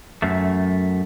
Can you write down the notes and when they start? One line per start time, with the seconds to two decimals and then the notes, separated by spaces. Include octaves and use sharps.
0.22 F#2 A3